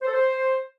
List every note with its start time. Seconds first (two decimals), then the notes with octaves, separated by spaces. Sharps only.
0.02 C5
0.08 A4
0.13 C5